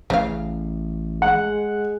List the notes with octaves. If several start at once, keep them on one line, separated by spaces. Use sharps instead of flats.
A1 C#3 F5
G#3 F#5